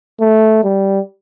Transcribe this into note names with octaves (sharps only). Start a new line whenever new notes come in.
A3
G3